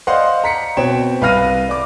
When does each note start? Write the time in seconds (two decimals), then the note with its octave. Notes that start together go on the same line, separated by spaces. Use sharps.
0.07 C5 D5 D#5 F5 F#5 C6
0.44 A#5 B6 C#7
0.77 B2 C4 C#5 G5 E7
1.21 C2 B4 F5 F6 A#6 D#7
1.69 D5 D6